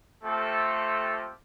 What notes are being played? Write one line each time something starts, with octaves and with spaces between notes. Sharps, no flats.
A3 C4 F4 G4 A4